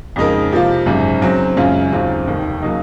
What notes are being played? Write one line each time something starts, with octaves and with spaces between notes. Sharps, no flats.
F2 C#3 G#3 D#4 A#4
C3 F3 A#3 F4
G#1 F#2 C#3
C#3 F#3 C4
F#2 C#3 G#3 C#4 F4
D#2 C#3 F#3 C4 F4
F1 D#2 D#3
C#3 F#3 A#3 D#4